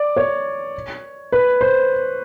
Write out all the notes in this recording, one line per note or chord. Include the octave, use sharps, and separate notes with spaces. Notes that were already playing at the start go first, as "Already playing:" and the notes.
Already playing: D5
C#5
B4
C5